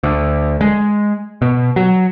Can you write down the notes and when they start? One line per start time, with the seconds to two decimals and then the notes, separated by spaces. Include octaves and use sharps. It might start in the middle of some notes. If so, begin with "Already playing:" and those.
0.03 D2
0.61 G#3
1.42 B2
1.76 F#3